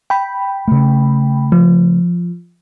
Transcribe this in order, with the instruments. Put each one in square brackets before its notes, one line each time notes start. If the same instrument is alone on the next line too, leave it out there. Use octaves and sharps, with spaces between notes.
[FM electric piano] G5 B5
[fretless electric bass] C#3 A3
[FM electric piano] F3